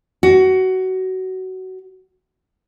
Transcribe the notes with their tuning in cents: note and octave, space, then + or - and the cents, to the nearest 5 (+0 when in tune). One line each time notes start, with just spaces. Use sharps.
F#4 +20